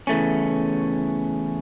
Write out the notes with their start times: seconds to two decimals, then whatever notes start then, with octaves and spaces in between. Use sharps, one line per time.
0.07 E2 C#3 E3 A3 C#4